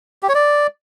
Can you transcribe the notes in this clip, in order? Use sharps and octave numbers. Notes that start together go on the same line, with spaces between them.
G4
C#5
D5